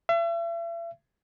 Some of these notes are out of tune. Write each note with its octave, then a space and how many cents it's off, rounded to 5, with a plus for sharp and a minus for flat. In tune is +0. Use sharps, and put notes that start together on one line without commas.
E5 +40